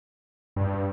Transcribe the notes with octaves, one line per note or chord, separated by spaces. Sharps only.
G2